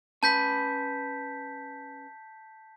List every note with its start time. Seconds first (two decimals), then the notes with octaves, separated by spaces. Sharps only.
0.23 C#4 B4 A5 B5 G6 B6